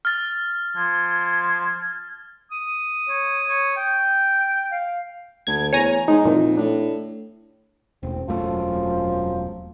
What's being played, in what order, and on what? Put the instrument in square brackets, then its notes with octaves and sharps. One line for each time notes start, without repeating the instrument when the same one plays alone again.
[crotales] F6 A6
[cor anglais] F3 [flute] G#6
[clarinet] D#6
[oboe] C#5
C#5
G5
[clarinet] F5
[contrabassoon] D2 [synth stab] G#6
[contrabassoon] E2 [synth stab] C#5 G#5 A#5
[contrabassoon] G#2 [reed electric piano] D#4
[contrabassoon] F2 [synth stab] A#2 E3
[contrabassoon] A2 [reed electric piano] D4
[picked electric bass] E1 [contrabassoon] A1 [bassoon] C4
[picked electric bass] E1 A3 [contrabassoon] F#2 [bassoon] F3